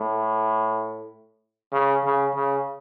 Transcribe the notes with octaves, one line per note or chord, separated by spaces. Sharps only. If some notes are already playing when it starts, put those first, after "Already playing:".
Already playing: A2
C#3
C#3
C#3